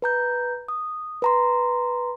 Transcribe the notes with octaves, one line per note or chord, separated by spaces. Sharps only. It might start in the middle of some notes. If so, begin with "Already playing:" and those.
B4 A#5 G6
D#6
B4 A#5 C6